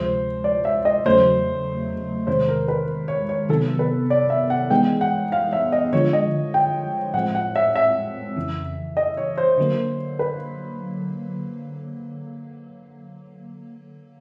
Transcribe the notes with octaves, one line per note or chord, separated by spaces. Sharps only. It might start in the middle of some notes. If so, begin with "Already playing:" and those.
Already playing: D2 C3 F3 G#3 C5
D5
E5
D#5
E2 C#3 F#3 A3 C5
E2 C3 D#3 G#3 C5
A#4
B4
C#5
C#5
C3 D#3 F#3 B3 A4
B4
D5
E5
F#5
E3 G#3 B3 D#4 G#4 G5
F#5
F5
E5
D#5
D3 F3 G#3 C#5
D#5
G5
A2 F3 G#3 C4 F#5
F#5
E5
E5
F2 C#3 E3
D#5
C#5
C5
D3 F#3 A#3
B4